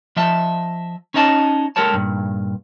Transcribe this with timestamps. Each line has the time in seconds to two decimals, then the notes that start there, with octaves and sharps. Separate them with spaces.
0.16 F3 D#5 E5 A5
1.14 C#4 D#4 C#5 D#5 A5
1.76 G#3 G4 A4 A#4 C#5 A5
1.94 G2 A#2